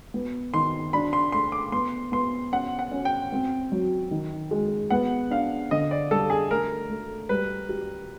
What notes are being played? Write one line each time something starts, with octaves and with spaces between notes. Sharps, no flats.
B3
D#3 C6
D4 B5
C6
A3 C6
D6
B3 C6
B3 C6
C#4 F#5
F#5
C#4
G5
C4
F#3
D#3
G#3
B3 F#5
D4 F5
D3 D#5
D5
G3 A4
G#4
A3 A#4
A3
G3 B4
G4